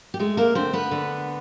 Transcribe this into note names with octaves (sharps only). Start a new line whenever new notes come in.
G4
G#3 A3 G#4
A#3 A#4
D3 C4 C5
B3 B4
D3